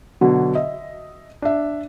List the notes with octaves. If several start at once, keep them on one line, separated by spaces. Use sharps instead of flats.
B2 D3 F#3
D#5 E5
D4 E5